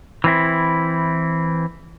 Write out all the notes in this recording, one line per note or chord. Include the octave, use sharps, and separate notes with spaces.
E3 C4 E4